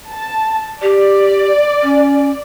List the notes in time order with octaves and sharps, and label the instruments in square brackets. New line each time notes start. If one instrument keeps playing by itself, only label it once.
[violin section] A5
[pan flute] G4 [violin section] D5
[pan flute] C#4